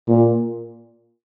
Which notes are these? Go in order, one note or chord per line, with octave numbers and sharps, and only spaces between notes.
A#2